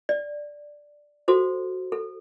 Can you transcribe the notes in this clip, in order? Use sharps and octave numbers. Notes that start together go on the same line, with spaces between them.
D5
F#4 A4 C5
A4